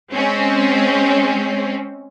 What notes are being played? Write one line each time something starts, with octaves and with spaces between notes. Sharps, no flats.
G#3 C4 C#4